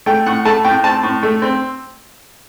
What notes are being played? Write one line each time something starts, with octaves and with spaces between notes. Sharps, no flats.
A3 G5
A2 F#5
A3 A5
A2 G5
C4 A5
A2
A3
C4